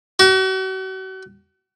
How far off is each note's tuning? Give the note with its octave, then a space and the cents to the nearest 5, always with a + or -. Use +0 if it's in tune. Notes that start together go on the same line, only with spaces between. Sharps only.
F#4 +40